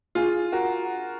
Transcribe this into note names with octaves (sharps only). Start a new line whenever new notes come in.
F4 G#4
F#4 A#4